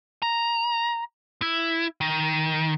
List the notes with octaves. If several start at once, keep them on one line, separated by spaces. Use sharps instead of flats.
A#5
E4
D#3